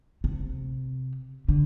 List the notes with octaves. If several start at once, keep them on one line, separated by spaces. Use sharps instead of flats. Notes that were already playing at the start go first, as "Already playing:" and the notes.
C3
D3